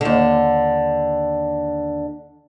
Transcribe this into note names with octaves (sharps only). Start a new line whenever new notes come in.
D#2 D3